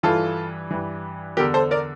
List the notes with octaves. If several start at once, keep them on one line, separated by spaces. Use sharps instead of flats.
G2 E3 F4 A4
G2 E3
E2 D3 G4 A#4
A4 C5
A#4 D5